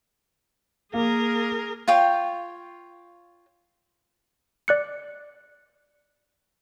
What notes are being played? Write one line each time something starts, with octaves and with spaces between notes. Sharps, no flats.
A#3 G#4 A#4
F4 C#5 G5
D5 F#6 C#7